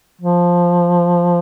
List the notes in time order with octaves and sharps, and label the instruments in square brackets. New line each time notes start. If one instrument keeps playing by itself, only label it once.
[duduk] F3